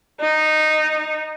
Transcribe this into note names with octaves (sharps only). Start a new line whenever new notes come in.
D#4